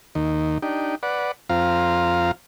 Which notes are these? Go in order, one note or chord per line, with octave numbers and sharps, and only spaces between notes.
D#2 D#3
D4 D#4 G4
B4 D5 F#5
F2 C4 F4 F5 A#5